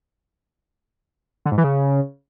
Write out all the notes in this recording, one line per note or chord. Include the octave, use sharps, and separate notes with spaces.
D3
G#2
E3
C#3